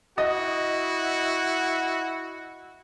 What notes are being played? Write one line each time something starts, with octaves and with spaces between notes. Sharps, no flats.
E4 F#4 D#5